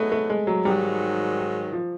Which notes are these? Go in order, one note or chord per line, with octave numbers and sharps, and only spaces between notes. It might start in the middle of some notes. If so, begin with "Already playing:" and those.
Already playing: F#3 A3 B3 D#4 G#4 B4
A3
G#3
F#3
G#2 D#3 F#3 G3
F3